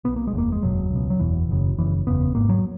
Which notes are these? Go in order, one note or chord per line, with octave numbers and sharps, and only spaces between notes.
B1 B2 B3
A#3
G#3
F#1 E2 C#3
A#3
G#3
F#1 E2 B2 F#3
C#2
B2
F#3
F#1 E2 B2 E3
F#1 F#2 C#3
F#1 F#2 C#3 E3
F#1 E2 C#3 B3
G#1 G#2 A#3
F#3